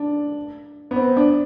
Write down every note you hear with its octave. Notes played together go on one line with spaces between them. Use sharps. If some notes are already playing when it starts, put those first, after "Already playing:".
Already playing: D4
B3
C4
D4